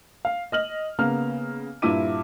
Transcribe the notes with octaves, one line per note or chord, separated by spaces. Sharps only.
F5
D#5 F6 F#7
C#3 A#3 B3 F6
G2 A#2 E4 E5 D6 D#7